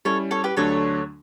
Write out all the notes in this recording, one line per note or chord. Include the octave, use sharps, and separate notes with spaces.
G3 C#4 E4 A4 C#5
A4 C#5
G4 B4
D2 D3 F#3 A3 D4 A4 C#5